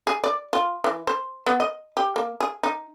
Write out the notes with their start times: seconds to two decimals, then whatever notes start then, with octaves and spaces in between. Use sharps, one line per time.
0.07 G#4
0.24 D5
0.53 F4
0.84 E3
1.07 C5
1.46 B3
1.60 D#5
1.97 G4
2.16 A#3
2.40 G#4
2.63 D#4